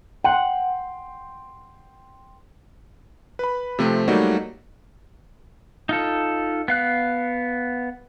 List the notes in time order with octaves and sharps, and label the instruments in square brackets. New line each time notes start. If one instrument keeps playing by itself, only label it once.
[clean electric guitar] F#5 [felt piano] G5 C6
[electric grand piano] B4 B5
C3 F3 A3 C4
F#3 G3 A3 A#3 D#4 F#4
[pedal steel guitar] D#4 F4 A4
B3 F5 F#6